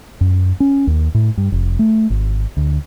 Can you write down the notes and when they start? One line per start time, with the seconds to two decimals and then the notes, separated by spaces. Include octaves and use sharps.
0.21 F#2
0.60 C#4
0.87 D#2
1.14 A2
1.37 G2
1.52 F1
1.79 A3
2.10 G#1
2.57 D2